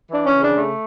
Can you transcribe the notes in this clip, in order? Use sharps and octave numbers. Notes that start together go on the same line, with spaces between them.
E3 D4
C#4
C#3
D4
A3